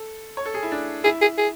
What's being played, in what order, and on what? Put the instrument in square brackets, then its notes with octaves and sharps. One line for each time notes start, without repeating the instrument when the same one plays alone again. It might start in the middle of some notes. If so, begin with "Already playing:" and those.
Already playing: [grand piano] A4
C#5
A4
G#4
E4
D4
[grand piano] E4 [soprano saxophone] G#4
[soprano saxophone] G#4
G#4